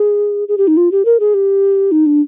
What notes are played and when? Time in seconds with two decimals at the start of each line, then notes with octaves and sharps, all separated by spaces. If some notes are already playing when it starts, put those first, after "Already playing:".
Already playing: G#4
0.48 G#4
0.58 G4
0.68 D#4
0.77 F4
0.92 G4
1.05 A#4
1.20 G#4
1.34 G4
1.92 D#4
2.06 D4